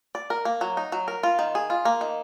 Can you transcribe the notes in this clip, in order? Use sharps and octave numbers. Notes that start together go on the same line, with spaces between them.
D5
A#4
A#3
F#3
D#4
F#3
A#4
F4
D#3
G#4
F4
A#3
D#3